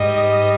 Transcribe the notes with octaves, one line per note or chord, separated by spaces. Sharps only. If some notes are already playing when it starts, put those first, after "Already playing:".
Already playing: G#2 G3 D#5